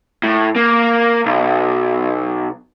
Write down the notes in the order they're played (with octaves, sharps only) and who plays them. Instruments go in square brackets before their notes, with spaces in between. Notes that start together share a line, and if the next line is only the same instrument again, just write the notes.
[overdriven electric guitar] A2
A#3
B1